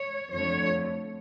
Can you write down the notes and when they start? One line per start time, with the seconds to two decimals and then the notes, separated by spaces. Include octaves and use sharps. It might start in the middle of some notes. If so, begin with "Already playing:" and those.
Already playing: C#5
0.32 F2 D3 F3 A3 C#5